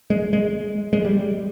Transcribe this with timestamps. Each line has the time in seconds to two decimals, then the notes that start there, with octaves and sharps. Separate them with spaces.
0.10 G#3
0.33 G#3
0.93 G#3
1.05 G3